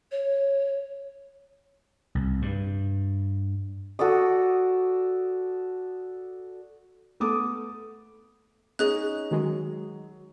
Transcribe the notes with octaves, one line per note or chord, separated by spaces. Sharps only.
C#5
C2
G2
F#4 A4 D5 D#6
A3 B3 A4 D6 D#6
C#4 D#4 G#4 D#5 F#6
D#3 F#3 G#3